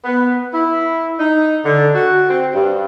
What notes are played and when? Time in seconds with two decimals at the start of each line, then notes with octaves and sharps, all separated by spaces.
0.05 B3
0.52 E4
1.20 D#4
1.65 D3
1.95 F#4
2.29 C4
2.54 G2